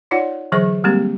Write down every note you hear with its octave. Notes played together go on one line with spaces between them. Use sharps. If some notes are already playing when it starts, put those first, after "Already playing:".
D#4 F4 C#5 D5 F#5
D3 E3 F#3 G#4 C5 C#6
G3 G#3 A#3 C4 G4